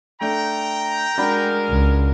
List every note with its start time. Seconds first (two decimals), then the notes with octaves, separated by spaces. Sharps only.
0.21 A3 D4 G5 A#5
1.18 G#3 D4 F#4 A#4 B5
1.70 C#2